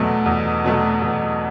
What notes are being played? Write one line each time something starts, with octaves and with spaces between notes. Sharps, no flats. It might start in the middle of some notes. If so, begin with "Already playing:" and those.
Already playing: E2 B2 F#3 A3
E2
B2 F#3 A3
E2